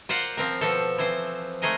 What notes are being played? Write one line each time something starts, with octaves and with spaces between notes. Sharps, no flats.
F4 A#4 C5 D5 F#5
F3 C4 A#4
B2 F3 C4 A4
E3 F3 C4 C5
G#3 A3 D#4 G#4 A#4 D#5